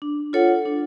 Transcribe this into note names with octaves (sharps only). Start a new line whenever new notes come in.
D4
F4 A4 C#5 F#5
D4